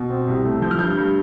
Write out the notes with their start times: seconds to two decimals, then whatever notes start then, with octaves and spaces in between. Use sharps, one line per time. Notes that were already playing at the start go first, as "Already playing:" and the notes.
Already playing: B2
0.10 C4
0.27 C2
0.45 A3
0.62 F3 G6
0.71 F6
0.79 G2 G6
0.97 G2